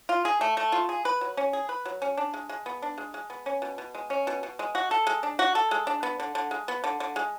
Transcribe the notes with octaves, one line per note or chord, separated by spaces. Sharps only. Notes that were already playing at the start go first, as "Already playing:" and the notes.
F4
G#4
A3
A3
F4
G#4
B4
F#3
C#4
G#4
B4
F#3
C#4
D4
G#3
G#3
B3
D4
G#3
G#3
B3
C#4
B2
B2
G#3
C#4
B2
B2
G#3
F#4
A4
G#3
D4
F#4
A4
G#3
D4
B3
D3
D3
G#3
B3
D3
D3
G#3